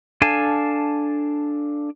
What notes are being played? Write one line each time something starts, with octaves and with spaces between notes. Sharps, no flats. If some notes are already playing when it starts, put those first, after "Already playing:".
D4 A4 F5 G#5 A5